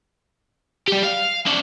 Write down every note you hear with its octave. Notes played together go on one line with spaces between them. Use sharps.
G3 G4
F5
C#4 D5